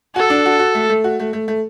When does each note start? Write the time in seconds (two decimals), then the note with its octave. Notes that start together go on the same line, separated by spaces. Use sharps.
0.16 F#4 A4
0.30 D4
0.46 F#4
0.59 F#4
0.75 A3
0.89 A3
1.04 F#4
1.19 A3
1.33 A3
1.48 A3